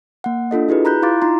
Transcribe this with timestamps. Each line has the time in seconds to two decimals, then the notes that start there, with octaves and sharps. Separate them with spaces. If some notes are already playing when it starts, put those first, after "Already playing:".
0.24 A#3 F#5
0.51 D4 F4 A4 D#5
0.69 E4 F#4 G#4 B4
0.85 A#5 B5 F#6 G6
1.02 E4 F4 F5 C6 D6 A6
1.22 D#4 F4 A#5 C6